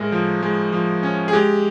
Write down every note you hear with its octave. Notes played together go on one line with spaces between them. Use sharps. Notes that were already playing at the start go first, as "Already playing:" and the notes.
Already playing: A2 G#3 A#4
F3
G#3
F3
C#4
G#4
G#3 G4